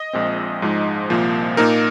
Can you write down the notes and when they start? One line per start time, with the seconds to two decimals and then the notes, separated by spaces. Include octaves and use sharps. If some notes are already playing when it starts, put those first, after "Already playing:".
Already playing: D#5
0.13 A#1 A#2 G#3 C4
0.62 G#2 F3 G#3 D#4
1.10 C2 A#2 F3 A#3
1.57 A#2 A#3 D#4 A#4